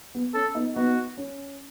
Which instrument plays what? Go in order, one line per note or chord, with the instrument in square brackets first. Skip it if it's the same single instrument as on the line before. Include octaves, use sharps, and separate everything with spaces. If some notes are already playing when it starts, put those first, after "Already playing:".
[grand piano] B3
[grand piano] C#4 [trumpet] A4
[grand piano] B3 D#4
[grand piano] B3 D#4 [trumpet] F#4
[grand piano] C#4